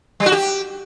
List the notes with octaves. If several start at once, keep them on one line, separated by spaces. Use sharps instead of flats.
G3
F#4
G4